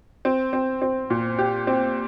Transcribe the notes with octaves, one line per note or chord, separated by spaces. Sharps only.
C4
C4
C4
A#2
G4
C4